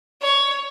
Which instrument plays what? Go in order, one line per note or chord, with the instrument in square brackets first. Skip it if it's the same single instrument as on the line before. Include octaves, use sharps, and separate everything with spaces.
[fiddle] C#5